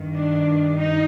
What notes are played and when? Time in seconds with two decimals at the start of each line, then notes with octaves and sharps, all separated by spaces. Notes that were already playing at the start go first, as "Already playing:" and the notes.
Already playing: G2 D#3
0.16 D4
0.76 D#4